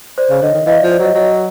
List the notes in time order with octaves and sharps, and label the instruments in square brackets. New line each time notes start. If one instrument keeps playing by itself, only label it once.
[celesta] C5 D5
[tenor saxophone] C#3
[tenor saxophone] D3 [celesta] C#5 D#5
[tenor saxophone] D#3
[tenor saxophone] E3 [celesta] D#5 F5
[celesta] D5 E5
[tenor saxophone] F3
[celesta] C5 D5
[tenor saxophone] F#3 [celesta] C#5 D#5
[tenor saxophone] F#3 [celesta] C#5 D#5